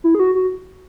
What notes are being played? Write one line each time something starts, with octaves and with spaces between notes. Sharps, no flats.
E4
G#4
F#4
F#4